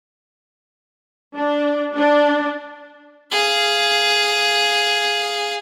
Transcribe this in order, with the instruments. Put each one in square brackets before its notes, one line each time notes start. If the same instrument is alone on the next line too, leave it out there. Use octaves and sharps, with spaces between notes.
[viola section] D4
D4
[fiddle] G#4 F5